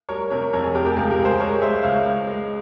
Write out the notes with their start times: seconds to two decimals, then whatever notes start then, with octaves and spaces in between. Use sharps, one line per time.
0.09 G3 A#4 C#5
0.30 C3 A#4 C#5
0.53 F2 A#4 C#5
0.63 G#4
0.75 F1 G4 A#4
0.85 G4 A#4
0.96 C#2 G#4
1.10 G4 A#4
1.19 C#2
1.25 G#4 C5
1.40 G#3 A#4 C#5
1.61 G#3 C5 E5
1.83 C#2 C#5 F5
2.06 C#2
2.27 G#3